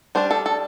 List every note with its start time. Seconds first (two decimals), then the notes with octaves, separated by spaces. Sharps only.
0.15 G3 D4 C5
0.31 A4
0.46 A4